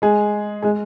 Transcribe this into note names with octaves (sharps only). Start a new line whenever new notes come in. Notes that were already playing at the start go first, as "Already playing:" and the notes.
G#3 G#4
G#3 G#4